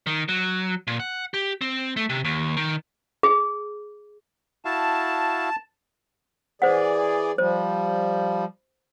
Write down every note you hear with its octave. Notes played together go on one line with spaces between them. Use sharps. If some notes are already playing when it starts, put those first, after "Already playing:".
D#3
F#3
A#2
F#5
G4
C4
A3
C3
D#2
D#3
G#4
E4 F#4 F5 A5
E3 G#4 C5 D5 F#5
F3 G3 C5